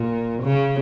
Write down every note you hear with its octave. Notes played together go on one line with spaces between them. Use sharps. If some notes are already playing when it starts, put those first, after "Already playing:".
Already playing: A#2
C#3